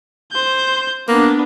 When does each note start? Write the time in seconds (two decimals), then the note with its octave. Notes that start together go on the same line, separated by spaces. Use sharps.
0.32 C5 G6
1.08 A#3 B3 D4